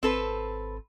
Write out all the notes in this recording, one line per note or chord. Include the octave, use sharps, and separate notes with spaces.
G#1 C4 A4 B4